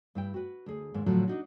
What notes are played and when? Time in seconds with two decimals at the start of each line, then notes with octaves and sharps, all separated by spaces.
0.15 G2 E4 G5
0.34 F#4 B4
0.66 D2 G#4
0.94 D#2 G#2
1.06 A2 D3 F3 F#3
1.28 D4 D#4 F#4